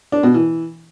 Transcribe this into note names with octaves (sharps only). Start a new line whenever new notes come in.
D4
B2
E3